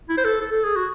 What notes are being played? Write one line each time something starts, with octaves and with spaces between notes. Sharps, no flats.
E4
C5
A4
A4
A4
G#4
F#4